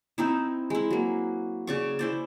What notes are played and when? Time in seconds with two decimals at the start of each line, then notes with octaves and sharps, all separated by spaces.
0.18 C4 D#4 E4
0.70 G#3 E4
0.90 F#3 A#3
1.67 C#3 D5 C#6
1.99 E4 C5 D5